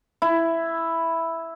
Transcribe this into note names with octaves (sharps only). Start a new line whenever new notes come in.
E4